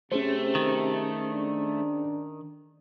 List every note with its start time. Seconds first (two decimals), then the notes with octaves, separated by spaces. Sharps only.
0.12 C3 A3 C#4 G#4 C5
0.55 D#3
1.30 D4